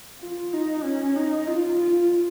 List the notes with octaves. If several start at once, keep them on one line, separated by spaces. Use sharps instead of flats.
F4
D#4
C#4
D#4
F4
F4